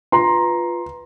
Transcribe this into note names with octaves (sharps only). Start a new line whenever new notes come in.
F4 B4 A#5 C6